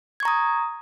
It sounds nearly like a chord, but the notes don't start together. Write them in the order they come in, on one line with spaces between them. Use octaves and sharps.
G#6 C#6 A#5 D#6